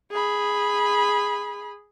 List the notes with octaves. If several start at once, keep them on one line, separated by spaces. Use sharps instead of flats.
G#4 B5